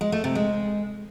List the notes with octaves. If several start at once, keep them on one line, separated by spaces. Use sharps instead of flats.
G#3
A3
C3
G#3